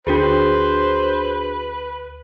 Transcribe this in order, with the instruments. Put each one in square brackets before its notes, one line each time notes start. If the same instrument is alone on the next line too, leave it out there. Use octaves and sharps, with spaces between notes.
[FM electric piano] D2 [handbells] D4 F#4 G#4 [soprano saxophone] B4 [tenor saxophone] C5